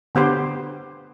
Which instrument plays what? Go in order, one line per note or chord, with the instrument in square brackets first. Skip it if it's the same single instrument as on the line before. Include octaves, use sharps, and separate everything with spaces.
[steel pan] D3 B3 G4 C5